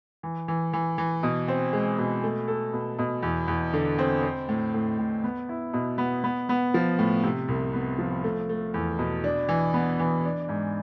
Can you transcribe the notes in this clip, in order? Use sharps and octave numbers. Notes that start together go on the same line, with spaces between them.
E3
E3
E3
E3
B2
C4
G#3
B2
A3
A4
B2
B2
E2
E2
D3
C4
C4
A2
A2
A2
B3
E4
B2
B3
B3
B3
F3
A2
C3
C2
B3
F3
A3
A3
E2
B2
D4
E3
B3
E3
D4
G#2